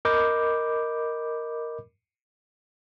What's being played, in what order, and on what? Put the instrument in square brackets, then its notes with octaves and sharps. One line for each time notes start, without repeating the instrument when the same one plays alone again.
[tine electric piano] A#4 D#5 B5 D6 G6